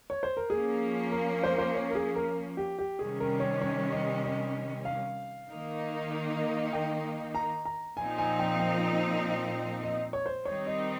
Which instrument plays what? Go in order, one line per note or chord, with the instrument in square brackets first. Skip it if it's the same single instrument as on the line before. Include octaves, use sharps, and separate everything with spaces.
[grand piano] C#5
C5
A#4
[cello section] F3 A#3 C#4 [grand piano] G#4
[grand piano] A#4
C5
A#4
C5
C#5
A#4
G#4
A#4
G4
G4
[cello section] C3 D#3 G3 C#4 [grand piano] G#4
[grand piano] A#4
C#5
C#5
D#5
D#5
F5
[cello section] D#3 A#3 D#4
[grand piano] G5
A#5
A#5
[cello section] A#2 F3 C4 D#4 [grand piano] G#5
[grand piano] G#5
G5
G5
D#5
C#5
C5
[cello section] D#3 G3 C4 D#4 [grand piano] C#5
[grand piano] D#5